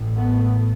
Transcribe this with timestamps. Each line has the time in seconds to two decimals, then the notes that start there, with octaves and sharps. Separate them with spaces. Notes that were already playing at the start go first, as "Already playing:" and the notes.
Already playing: A1 A2
0.16 A3 B3